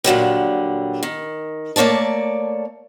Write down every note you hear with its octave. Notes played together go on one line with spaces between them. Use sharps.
A#2 D3 F#3 G3
D#3
A3 A#3 C#5 D5 A5